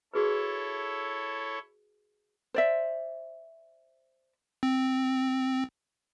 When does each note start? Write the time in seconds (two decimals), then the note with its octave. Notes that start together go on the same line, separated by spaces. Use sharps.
0.14 E4 F#4 G#4 A4 B4 C#5
2.54 C5 D5 E5
4.63 C4